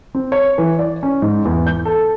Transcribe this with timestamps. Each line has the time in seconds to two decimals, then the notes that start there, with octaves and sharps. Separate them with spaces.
0.15 C4
0.32 C#5
0.58 E3
0.79 D5
1.03 C#4
1.22 G#2
1.45 E2
1.67 G6
1.85 A4